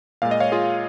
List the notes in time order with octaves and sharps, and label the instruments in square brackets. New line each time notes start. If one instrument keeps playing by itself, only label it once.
[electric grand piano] A#2 G#3 F5
D#5
C#5 F5
F4 G#4